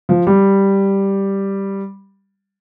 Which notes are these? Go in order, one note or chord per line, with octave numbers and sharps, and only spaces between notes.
F3
G3